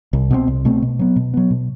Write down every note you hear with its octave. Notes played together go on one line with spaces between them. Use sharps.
C2
B2 A3 C4
C2
B2 A3 C4
B2
F#3 B3
B2
F#3 B3
B2